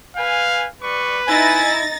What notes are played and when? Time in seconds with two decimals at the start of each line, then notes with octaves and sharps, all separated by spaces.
0.16 B4 F5 G#5
0.82 G3 B4 D5 C#6
1.27 D#4 E4 G#5 A6 A#6